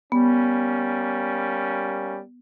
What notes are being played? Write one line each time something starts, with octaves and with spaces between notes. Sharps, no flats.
G3 A#3 B3 C#4